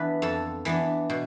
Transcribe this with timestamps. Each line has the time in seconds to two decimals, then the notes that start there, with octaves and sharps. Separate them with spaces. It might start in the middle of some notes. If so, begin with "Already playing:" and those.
Already playing: E3 B3 D4 B4
0.22 F2 A4
0.65 E3 B3 D4
1.10 B2